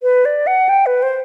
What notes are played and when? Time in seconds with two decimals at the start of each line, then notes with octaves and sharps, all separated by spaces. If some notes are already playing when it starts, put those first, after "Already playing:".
0.03 B4
0.25 D5
0.47 F#5
0.69 G5
0.86 B4
1.03 C5